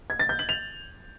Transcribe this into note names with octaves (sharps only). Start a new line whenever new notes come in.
G#6
A6
G6
F#7
F7